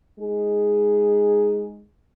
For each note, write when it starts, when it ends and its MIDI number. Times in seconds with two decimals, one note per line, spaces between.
0.20 1.83 56
0.20 1.83 63
0.20 1.83 68